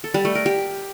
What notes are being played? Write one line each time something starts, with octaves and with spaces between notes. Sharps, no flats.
A4
G3
A3
A#4
G4